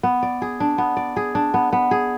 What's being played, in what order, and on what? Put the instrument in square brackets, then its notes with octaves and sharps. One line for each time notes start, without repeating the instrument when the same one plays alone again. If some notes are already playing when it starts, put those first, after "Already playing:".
[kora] B3
D5
G#4
D4
B3
D5
G#4
D4
B3
B3
G#4